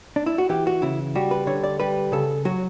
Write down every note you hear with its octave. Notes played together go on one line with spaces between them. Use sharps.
D4
E4
F#4
E3 G4
F#4
C#3 E4
G3 F#4
B4
D3 C#5
D5
G3 B4
C#3 A4
F#3 F#4